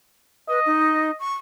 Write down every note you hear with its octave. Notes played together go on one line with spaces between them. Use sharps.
B4 D#5
D#4
C#6